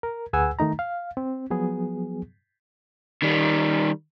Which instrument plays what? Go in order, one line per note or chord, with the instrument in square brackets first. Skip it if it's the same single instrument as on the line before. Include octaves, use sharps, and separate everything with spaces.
[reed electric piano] A#4
D2 G#4 B4 F#5 G#5 E6
D#3 A3 D#4 A#5
F5
C4
F3 F#3 B3 G#4
[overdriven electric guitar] D#3 G3